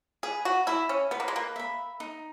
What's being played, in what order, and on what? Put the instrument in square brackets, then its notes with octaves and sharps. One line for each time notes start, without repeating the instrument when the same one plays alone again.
[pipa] G#4 [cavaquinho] B4
[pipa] F#4
[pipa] E4 [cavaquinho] E5 B5
[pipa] C#4
[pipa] B3 [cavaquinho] B4
[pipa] A#3
G#3
A#3
[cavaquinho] E5 B5
D#4